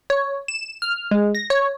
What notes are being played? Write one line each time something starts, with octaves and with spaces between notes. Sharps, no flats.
C#5
E7
F6
G#3
A#6
C#5